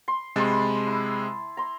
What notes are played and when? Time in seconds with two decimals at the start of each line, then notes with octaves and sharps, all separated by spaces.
0.08 C6
0.36 C3 G#3 A5 B5 C6
0.87 E4
1.57 A#5 C6